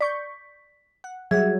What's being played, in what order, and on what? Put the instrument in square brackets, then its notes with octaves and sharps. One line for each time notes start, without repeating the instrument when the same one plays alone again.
[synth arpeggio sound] D5 C#6 G6 [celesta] B6
[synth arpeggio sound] F#5
[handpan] F#3 G3 [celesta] G#4 G#6 [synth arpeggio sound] E5 F#5